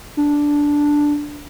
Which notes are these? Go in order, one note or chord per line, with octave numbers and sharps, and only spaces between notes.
D4